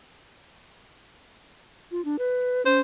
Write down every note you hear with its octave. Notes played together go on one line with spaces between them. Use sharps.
F4
D4
B4
C#4 C5